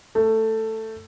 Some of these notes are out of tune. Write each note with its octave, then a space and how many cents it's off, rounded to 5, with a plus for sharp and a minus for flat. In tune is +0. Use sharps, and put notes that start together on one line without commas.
A3 +10